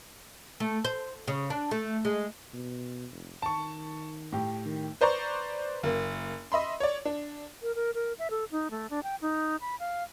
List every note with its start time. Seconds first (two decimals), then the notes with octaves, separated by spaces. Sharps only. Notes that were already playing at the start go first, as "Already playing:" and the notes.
0.60 A3
0.85 C5
1.28 C#3
1.50 D4
1.71 A3
2.05 G#3
2.53 B2
3.11 F1
3.42 D#3 A5 C#6
4.32 A2 G4
4.65 D#3
5.01 B4 C5 D5 A#5 C#6
5.83 F#1 A#3
6.52 D#5 E5 B5 C6
6.80 C#5 D5
7.05 D4
7.61 A#4
7.75 A#4
7.95 A#4
8.19 E5
8.31 A4
8.51 D#4
8.71 A3
8.90 D4
9.03 G5
9.22 D#4
9.61 B5
9.80 F5